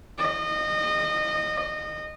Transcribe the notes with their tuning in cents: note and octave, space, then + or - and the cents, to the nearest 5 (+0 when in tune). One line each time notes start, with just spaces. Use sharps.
D#5 -25